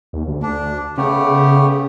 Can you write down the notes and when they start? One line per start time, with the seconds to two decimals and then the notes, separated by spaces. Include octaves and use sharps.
0.13 D#2
0.27 D2
0.42 D4
0.97 C#3 A3 B3 G4